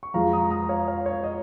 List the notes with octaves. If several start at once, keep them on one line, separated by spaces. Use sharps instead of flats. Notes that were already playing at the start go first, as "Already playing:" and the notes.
C#6
F2 F3 G#3 F5 A#5
A#5 D#6
A#5 D#6
C#5 F5
C#5 F5
C#5
D#5